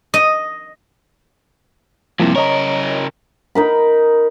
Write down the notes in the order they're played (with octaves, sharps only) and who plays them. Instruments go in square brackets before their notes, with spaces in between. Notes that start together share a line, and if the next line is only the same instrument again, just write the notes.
[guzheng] D#5
[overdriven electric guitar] G2 C3 [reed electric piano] F3 A#3 E4
[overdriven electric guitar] C#3 A#4 [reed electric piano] C#5 D#5 A#5
[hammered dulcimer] D#4 A#4 B5